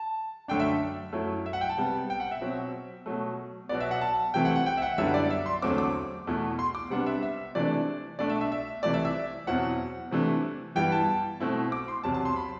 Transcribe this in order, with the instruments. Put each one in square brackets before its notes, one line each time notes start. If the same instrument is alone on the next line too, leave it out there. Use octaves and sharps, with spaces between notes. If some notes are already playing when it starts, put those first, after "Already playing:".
Already playing: [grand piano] A5
F#2 D3 A3 D4 G5
E5
F#2 F#3 A3 E4
E5
F#5
G5
A5
C3 G3 B3
G5
F#5
E5
B2 F#3 C4
B2 F#3 A3
B2 F#3 B3 D5
E5
F#5
A5
C3 E3 A3 C4 E4 G5
F#5
F#5
G5
E5
F#5
F#2 D3 G3 B3 E4 E5
D5
E5
C6
E2 D3 F#3 A3 C4 D6
D6
E2 B2 A3 E4
C6
D6
C3 G3 B3 D4 F#5
E5
E5
C3 E3 A3 D4 D5
B2 A3 D4 D5
E5
E5
E5
C3 E3 A3 D5
E5
E5
E2 B2 F#3 C4 E4 F#5
C3 E3 A3 D4
G2 E3 G3 B3 E4 G5
A5
B2 A3 C4 E4
D6
C6
E2 C3 F#3 A5
A5
C6
B5